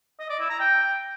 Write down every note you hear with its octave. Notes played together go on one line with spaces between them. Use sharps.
D#5
D5
E4
A#5
G5